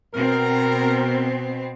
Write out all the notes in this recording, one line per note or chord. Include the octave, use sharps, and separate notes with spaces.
B2 B3 C4 A#4